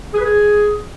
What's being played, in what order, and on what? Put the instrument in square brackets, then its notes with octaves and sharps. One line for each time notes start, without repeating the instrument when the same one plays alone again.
[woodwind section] G#4
B4
G#4